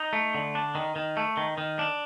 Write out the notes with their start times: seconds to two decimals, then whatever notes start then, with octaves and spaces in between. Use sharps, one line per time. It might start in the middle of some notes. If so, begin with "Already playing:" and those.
Already playing: D#4
0.13 A3
0.35 D3
0.55 D4
0.75 D#3
0.96 D#3
1.17 A3
1.37 D#3
1.58 D#3
1.79 D4